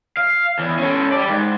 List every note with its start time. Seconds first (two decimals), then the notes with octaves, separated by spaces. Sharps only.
0.17 F5
0.59 E2
0.79 C#4 A4
1.12 G3 D5
1.28 G#2